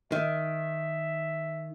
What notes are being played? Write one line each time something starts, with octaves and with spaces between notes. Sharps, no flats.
D#3 E5